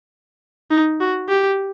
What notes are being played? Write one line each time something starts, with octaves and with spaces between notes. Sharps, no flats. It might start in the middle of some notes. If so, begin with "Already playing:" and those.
D#4
F#4
G4